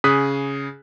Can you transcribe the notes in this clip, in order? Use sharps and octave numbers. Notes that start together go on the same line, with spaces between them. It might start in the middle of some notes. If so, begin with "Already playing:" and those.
C#3 G#4 D#6 F#6 B6